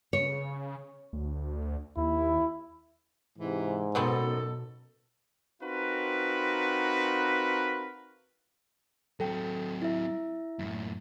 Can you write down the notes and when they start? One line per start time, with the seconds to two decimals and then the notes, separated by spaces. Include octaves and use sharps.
0.13 C#3 C#5
1.13 D2
1.97 D#2 E4
3.38 G#2 C3 E3
3.95 F#2 B2 F#3 B3 C4 D#4 A4
5.61 C4 D#4 F4 F#4 A#4 B4
9.20 F#3 C4 A4 G5
9.82 E4 E5
10.59 F#2 A2